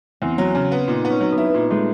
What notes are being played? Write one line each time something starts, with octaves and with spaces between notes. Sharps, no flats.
E2 C4
F#3
C#3
B3
A#2 D#4
B3
C#4
F#3
B3
E4
A#2
G#3 A3